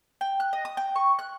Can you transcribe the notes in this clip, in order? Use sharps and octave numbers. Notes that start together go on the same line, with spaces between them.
G5
F#6
D#5
D#6
G5
C#6
F#6